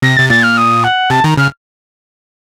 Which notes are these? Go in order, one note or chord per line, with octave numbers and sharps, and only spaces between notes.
C3 A#6
C3 A6
A#2 A6
F6
D#6
F#5
C3 A5
D#3 A#5
C#3 F6